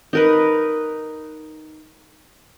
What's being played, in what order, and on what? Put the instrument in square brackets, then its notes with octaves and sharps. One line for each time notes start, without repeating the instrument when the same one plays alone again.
[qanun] D#4 A#4 B4